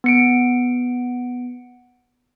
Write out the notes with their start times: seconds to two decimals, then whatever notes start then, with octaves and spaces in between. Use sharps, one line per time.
0.04 B3 C#7 D7